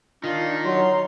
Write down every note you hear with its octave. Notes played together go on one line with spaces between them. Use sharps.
D#3 D4 D#4 F4
F#3 A#5 C6